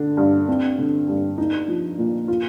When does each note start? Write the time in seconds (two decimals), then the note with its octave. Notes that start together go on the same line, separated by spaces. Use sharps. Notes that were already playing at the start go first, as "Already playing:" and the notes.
Already playing: D3 D4
0.17 G2
0.48 C4
0.78 D3
1.08 G2
1.38 D#4
1.68 F3
1.98 A#2
2.28 F4